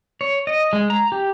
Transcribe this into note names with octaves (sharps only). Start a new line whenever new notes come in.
C#5
D#5
G#3
A#5
G4